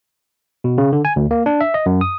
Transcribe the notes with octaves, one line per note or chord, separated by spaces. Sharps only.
B2
C#3
D3
G#5
D2
A#3
D4
E5
D#5
F#2
D#6